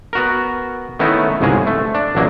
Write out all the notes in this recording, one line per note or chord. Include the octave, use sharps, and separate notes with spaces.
B3 F#4 A#4
D#3 A3 B3 C#4 D#4 E4
G1 C2 G#2 C#3 G#3 G#4
A3
D4
A1 F#3 A#3